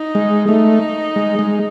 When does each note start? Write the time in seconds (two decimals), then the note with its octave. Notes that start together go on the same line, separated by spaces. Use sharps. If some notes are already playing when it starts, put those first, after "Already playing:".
Already playing: D#4
0.15 G#3
0.49 A3 D#4
1.16 G#3
1.39 G#3